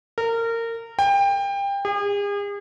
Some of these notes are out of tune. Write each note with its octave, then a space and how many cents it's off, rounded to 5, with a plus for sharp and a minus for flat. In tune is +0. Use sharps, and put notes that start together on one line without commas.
A#4 -25
G5 +25
G#4 -40